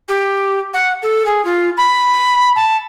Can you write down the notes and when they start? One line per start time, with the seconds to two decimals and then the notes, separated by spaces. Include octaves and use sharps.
0.08 G4
0.73 F#5
1.02 A4
1.25 G#4
1.44 F4
1.77 B5
2.55 A5